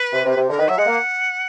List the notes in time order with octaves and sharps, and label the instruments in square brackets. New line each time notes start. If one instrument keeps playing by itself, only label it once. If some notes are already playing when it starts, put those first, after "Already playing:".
Already playing: [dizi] B4
[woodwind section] C3
C3
C3
[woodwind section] D3 [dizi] A#4
[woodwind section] D#3 [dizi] B4
[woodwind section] F#3 [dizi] E5
[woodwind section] G#3 [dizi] F#5
[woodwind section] A#3